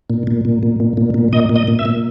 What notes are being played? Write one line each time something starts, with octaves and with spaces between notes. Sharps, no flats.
A#2
A#2
A#2
A#2
A#2
A#2
A#2
A#2 D#5
A#2
D#5
A#2
E5
A#2